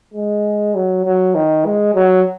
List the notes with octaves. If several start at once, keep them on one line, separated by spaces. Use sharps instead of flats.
G#3
F#3
F#3
D#3
G#3
F#3